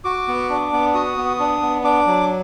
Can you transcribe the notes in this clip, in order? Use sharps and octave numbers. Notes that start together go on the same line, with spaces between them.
F#4 D6
B3
D4
B3
F#4 D#6
B3
D4
B3
D4 D6
F#3